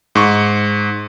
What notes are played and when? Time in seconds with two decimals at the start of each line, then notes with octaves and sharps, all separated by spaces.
0.15 G#2 C#6